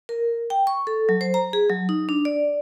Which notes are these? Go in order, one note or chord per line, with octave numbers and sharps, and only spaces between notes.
A#4
G5
C#6
A4
F#3
C5
A#5
G#4
F#3
D#4
D4
D5